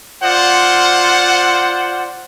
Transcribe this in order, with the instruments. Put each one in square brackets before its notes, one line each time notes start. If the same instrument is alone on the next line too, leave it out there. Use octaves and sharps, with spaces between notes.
[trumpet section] F4 C5 D5 F#5